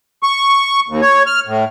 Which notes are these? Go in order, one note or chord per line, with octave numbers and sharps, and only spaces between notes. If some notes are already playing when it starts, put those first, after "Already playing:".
C#6
D#2
C#5
F6
A2